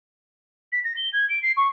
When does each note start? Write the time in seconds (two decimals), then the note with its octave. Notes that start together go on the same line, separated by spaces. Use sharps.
0.72 B6
0.84 A#6
0.97 G7
1.13 G#6
1.29 D7
1.43 C7
1.57 C#6